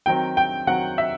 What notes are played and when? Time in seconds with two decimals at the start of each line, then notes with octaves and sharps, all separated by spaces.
0.06 D#3 F#3 C4 G5
0.37 G5
0.67 D#3 F#3 C4 F#5
0.98 E5